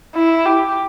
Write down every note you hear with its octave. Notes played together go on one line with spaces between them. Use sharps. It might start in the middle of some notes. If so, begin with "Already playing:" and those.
E4
G4